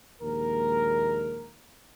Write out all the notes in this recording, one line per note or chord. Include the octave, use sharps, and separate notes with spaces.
A#1 D#2 G#3 A#4